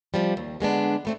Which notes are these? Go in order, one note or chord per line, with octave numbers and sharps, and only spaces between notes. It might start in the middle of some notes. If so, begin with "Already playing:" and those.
C3 F3 G3
D#2
D3 G#3 B3 D4
G3 A3 C4